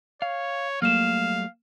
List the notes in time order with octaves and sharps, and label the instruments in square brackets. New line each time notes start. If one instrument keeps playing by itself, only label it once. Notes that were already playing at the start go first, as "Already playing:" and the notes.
[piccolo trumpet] C#5 [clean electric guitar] F5
[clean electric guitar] F#3 G3 A3 [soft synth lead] A#3 [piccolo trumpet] F5 [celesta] F6 E7